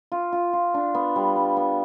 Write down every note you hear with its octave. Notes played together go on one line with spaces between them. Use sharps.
F4
F4
F4
D4
B3
G3
G3
B3